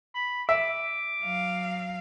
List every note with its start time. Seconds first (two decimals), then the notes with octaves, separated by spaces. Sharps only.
0.14 B5
0.49 E5 D6
1.23 F#3 F5